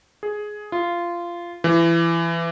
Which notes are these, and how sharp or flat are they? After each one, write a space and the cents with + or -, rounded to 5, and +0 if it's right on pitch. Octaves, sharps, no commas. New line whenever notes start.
G#4 +10
F4 -15
E3 +25